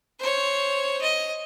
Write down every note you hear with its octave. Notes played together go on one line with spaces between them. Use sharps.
C5 C#5
D#5